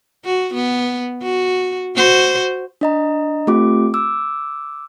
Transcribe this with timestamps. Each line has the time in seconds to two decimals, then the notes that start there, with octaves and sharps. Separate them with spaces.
0.25 F#4
0.54 B3
1.22 F#4
1.95 F#4 C5
2.81 D4 D#5 A#5
3.47 A3 C4 F4 G4 D6
3.94 D6 E6